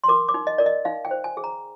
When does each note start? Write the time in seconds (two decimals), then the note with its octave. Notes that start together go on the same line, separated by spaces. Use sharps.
0.04 C6
0.08 A#4 D6
0.29 D6
0.34 D#4
0.47 D#5
0.58 A#4 D5
0.66 D#5
0.85 D#4 F5
1.05 G5
1.11 C5
1.24 G#5
1.37 G#4
1.44 A#5